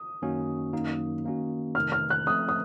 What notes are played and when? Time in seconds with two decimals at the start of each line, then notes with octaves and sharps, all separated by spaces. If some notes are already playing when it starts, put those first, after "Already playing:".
Already playing: D#6
0.22 F#2 D#3 A#3 C#4 F#4
0.73 F#2 D#3 F#3 A#3 D#4
1.24 D#3 A#3 C#4 F#4
1.75 F2 C3 D#3 A3 F6
1.92 F6
2.10 F#6
2.26 F3 A3 C4 D#6
2.49 D#6